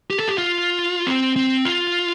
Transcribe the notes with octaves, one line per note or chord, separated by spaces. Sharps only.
G4
A4
G4
F4
C4
C4
F4